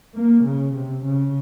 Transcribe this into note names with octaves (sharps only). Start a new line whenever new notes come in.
A#3
C#3
C3
C#3